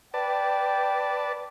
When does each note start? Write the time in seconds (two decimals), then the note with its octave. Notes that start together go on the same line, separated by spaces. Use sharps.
0.14 B4 D5 G5 A5